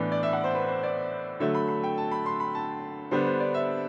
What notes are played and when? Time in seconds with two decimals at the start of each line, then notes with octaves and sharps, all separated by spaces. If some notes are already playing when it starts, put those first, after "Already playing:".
Already playing: A2 E3 B3 D4 D5
0.12 D5
0.23 E5
0.33 F#5
0.44 C5
0.55 B4
0.69 C5
0.83 D5
1.40 D3 F#3 A3 E5
1.54 B5
1.68 B5
1.83 G5
1.98 A5
2.11 B5
2.26 C6
2.40 B5
2.55 A5
3.11 D3 G3 B3 D4 C5
3.26 C5
3.40 D5
3.54 E5